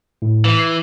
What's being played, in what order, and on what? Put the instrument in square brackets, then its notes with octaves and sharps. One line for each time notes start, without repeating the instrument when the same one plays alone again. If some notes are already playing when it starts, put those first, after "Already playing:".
[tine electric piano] A2
[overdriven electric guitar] E3
[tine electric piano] C7